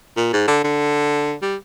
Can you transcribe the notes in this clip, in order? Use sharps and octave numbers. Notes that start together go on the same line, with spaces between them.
A#2
G#2
D3
D3
G3